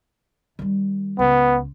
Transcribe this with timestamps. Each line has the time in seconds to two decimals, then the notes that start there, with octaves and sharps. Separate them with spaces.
0.59 D#3 G3
1.19 C#2 B3